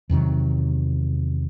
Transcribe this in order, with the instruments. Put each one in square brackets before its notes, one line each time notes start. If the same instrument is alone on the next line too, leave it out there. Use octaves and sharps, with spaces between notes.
[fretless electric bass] E2 C3 D#3 F#3